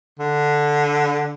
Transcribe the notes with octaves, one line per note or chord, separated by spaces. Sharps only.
D3